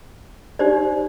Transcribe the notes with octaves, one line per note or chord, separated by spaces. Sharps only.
D#4 G4 C5 D5